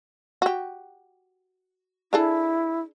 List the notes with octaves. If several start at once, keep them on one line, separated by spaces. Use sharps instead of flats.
F#4 G4
D4 E4 G#4 A4